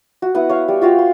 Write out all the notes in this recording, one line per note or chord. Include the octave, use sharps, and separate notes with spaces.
F#4
B3 E4 B4 F#5
C#5 F5
G3
F4 F#4 F5 G5
C6